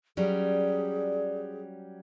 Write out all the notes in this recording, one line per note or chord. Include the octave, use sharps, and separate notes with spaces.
F#3 G3 C#4 G#4 D5